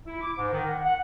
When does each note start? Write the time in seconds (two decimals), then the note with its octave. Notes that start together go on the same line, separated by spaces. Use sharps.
0.07 E4
0.21 D6
0.38 G#2
0.53 D#3
0.68 F#5
0.85 F#5